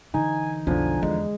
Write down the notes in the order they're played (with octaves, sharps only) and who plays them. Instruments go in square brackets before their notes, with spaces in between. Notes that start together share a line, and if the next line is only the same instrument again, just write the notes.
[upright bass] D3 E3 [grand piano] D#4 [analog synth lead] G#5
[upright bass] B1 F2 [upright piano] D3 F3 [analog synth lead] G#5
[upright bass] E2 [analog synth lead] G#3